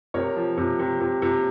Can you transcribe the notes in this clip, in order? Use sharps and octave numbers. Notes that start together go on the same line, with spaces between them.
C3 A#4 C#5
F3
C3
C3
C3
C3